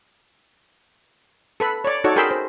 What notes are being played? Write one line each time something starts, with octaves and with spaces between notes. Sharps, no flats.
A4 B4 B5
C#5 D5
D#4 F#4 A4 C#5 D5
G#4 A#4 G5 B5 C6 E6
C5